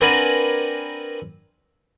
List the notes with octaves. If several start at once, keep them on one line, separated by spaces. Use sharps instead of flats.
C4 D4 A#4 B4 F#5 G#5